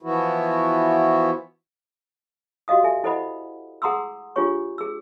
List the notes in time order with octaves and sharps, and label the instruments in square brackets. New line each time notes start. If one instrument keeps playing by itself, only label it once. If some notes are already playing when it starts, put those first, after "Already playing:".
[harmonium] E3 F3 B3 E4 F#4
[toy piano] F#4 G4 D#5 F5 D#6
A4 E5 G#5
E4 A4 C5 D#5 F#5 B5
G#4 F#5 A#5 C6 D#6 E6
D4 F4 G4 G#4 C#5 C#6
G#4 E6